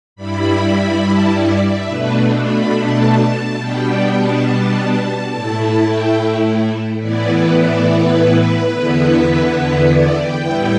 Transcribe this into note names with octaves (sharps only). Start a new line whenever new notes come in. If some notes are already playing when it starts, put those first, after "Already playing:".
G2 G3 E4 B5
A5
D5
E5
B2 A3 D4 B4
B5
A5
B2 G3 B3 D4 G5
G5
A5
A5
A2 A3 E4 A5
A5
G5
A2 E3 B3 E4 D5
B4
D5
B4
E2 D3 B3 E4
B4
D5
G5
A2 G3 B3 E4